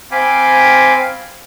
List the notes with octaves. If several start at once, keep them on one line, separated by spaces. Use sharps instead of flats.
C4 F5 G5 G#5 B5 D6